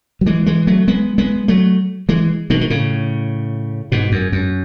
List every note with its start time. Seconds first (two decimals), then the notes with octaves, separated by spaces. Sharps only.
0.21 F#3
0.26 E3 G#3
0.46 E3 G#3
0.67 F#3 A3
0.88 G#3 B3
1.18 G#3 B3
1.48 F#3 A3
2.09 E3 G#3
2.50 B2 D#3
2.61 D#3
2.70 A2 C#3
3.92 G#2 B2
4.12 F#2
4.32 F#2